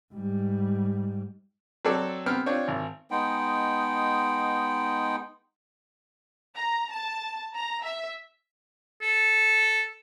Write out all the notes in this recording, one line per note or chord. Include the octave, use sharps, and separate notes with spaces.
G#2 G3
F#3 C4 A4 D5
B3 C4 F6
C4 D4 F4 C#5
G#1
G#3 B3 D#4 G5
A#5
A5
A#5
E5
A4